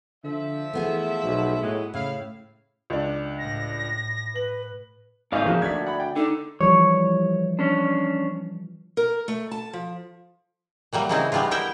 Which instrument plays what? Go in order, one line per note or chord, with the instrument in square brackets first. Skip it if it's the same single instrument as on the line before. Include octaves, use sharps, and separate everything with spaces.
[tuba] D3 [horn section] F3 E5
[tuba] E3 [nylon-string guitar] A3 B3 G#4
[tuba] B1
[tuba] A2 [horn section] F#3 G#3 B4
[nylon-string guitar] A2 [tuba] C#3 [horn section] E4 F5
[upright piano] C#2 D4
[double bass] A2 [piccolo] A#6
[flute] B4 [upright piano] F#7
[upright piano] G#1 G6 [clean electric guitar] C#3 F5 [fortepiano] A3 D#4 D5 [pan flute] G#5
[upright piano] A#2 F3 G#4 [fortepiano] A#3 D#4 F#4
[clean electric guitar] D2 [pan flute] D5 [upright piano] G#6 B6
[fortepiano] F#5 B5
G5
[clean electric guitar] D3 [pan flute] D#4
[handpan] E3 F3 G3 [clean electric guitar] C#5
[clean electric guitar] C#4 D4
[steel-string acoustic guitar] A#4
A3
A5
F3
[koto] E3 F#3 G3 A#3
C#3 E3 A#3 C4 D#4 E4
G3 G#3 B3 D4 F4
B3 E4 A#4 E5 G5